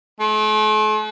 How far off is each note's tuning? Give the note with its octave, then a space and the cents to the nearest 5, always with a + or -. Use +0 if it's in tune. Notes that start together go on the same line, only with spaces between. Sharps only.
A3 -45